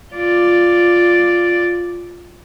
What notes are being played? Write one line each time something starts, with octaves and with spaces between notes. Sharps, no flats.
F4 D5